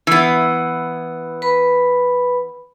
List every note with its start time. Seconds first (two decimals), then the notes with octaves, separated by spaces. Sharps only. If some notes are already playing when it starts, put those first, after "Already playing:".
0.07 E3 B3
1.42 B4 B5